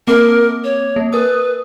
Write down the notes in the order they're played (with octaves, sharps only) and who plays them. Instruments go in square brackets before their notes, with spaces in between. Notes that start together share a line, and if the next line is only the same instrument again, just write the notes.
[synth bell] A#3 C4 D6 [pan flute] A#4
[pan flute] C#5
[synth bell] A#3
[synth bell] A#4 D#6 [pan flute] B4